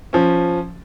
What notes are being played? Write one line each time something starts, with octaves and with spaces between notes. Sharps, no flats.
F3 C#4